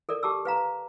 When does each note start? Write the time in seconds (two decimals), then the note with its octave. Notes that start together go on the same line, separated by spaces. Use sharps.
0.09 A4 A#4 D5
0.23 G4 A5 D6 E6
0.45 B4 F5 A#5